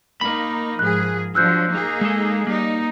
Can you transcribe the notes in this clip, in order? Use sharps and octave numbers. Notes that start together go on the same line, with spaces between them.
A#3 D#4 A#4 B5
G#2 F3 G#4 F#6
F3 F#3 D4 E6 F#6 G6
A#3 D#4 G#4
G#3 A4
G3 A#3 D#4